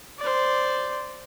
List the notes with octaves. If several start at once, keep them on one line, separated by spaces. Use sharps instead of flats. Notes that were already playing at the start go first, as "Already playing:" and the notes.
C5 D5